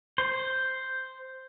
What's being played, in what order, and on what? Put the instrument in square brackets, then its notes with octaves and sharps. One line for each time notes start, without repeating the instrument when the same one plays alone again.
[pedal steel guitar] C5